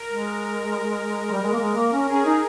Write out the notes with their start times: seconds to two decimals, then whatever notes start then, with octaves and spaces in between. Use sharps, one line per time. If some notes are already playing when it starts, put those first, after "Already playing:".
Already playing: A#4
0.08 G#3
1.31 G3
1.42 G#3
1.52 A#3
1.59 G#3
1.75 A#3
1.93 C#4
2.09 C#4 G#4
2.26 D#4